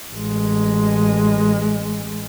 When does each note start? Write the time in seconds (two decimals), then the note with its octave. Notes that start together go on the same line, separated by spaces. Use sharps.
0.12 A1 G#3